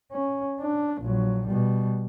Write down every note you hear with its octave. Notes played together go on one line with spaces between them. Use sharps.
C#4
D4
A#1 F#3
B2 G3